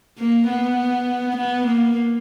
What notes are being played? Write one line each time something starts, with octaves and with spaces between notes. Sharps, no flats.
A#3
B3
B3
A#3